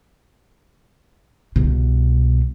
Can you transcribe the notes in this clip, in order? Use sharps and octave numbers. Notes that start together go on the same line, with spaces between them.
C2 B2